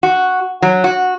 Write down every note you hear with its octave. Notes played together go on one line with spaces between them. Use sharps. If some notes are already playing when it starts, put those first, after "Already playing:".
F#4
F#3
F#4